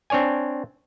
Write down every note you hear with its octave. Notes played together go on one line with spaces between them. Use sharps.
C4 D4 C#5 D5 G#5